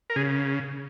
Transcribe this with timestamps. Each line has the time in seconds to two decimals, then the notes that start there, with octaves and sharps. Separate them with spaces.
0.10 A#4
0.16 C#3 G#4